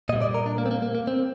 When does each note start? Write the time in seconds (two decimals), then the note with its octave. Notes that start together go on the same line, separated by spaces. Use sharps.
0.09 A#2 D#5
0.12 G3
0.21 D5
0.34 A#4
0.46 D4
0.58 A#3
0.66 C4
0.71 A#3
0.82 A#3
0.95 A#3
1.07 C4